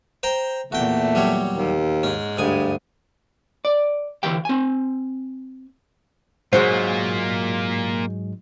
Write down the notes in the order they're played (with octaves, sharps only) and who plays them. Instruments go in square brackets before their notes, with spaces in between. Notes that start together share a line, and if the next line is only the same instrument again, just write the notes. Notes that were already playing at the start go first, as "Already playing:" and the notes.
[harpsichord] C5 G5 A#5
[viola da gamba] E2 A#2 [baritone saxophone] A3 [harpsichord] F#4 G5
[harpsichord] F#3 G3 C#5
[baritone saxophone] D#2
[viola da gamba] G#2 [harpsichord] C#4
[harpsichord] D2 G#5 D#6 [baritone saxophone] G2
[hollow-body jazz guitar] D5
D2 E3 G4 F5 G5
C4 G#5
[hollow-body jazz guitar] G#2 F#3 G#3 [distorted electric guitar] A#3 F4 [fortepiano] C5